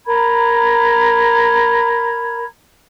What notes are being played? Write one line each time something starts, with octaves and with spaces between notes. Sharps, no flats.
A#4 A#5 B5 G#6